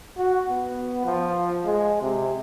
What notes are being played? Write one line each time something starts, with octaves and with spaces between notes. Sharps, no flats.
F#4
B3
F3
G#3
C3